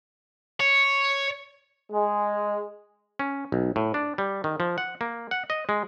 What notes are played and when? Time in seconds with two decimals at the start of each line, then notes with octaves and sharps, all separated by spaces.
0.60 C#5
1.92 G#3
3.19 C#4
3.52 B1
3.76 A2
3.94 D4
4.18 G3
4.44 D#3
4.60 F3
4.78 F#5
5.01 A#3
5.31 F#5
5.50 D#5
5.69 G#3